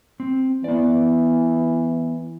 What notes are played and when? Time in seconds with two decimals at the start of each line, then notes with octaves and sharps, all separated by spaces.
0.20 C4
0.64 E3 B3 D5